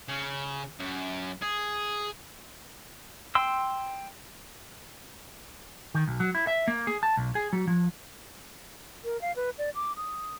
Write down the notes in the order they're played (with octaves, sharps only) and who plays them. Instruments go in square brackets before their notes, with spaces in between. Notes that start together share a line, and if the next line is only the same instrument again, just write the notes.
[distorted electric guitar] C#3
F#2
G#4
[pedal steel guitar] G5 C6 E6
[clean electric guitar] D#3
B1
F#3
E4
E5
A#3
G#4
A5
B1
G#4
F#3
F3
[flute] A#4
F5
B4
D5
D6
D#6